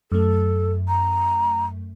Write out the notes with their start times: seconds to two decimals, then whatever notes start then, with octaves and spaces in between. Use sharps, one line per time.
0.12 F#2 A3 A4
0.88 A#5